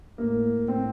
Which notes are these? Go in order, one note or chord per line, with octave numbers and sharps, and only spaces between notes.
A2 A#3
A2 C4